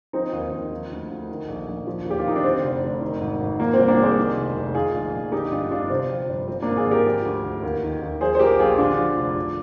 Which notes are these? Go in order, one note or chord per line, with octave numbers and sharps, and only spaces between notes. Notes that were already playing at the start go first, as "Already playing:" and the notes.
F3 C4 D#4
D#2
D#2
F3
D2
D2
D#3
A#1
A#1
F3
D#2 G4
F4
D#2 D#4
D4
D3 C4
F1
F1
D#3
G#1
G#1
F3 A#3
C4
C2
A#3 D4
C2 G#4 C5
D#3
F1
F1
D#3 F4 G#4
A#1
A#1
D3 D#4 G4
G1 D4 F4
G1 D4 F4
C3 C4
F3
G1
F3 C4
A#3 D4
G#1
F4 G#4
G#1
G4 A#4
F3
D2
D2
D#2
D#3
D#2
F3 G#4 C5
C5
A#1 G4 A#4
A#1 F4 G#4
D3 D4 F4
F3
F1
F3